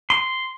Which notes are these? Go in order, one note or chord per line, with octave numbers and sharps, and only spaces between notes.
C6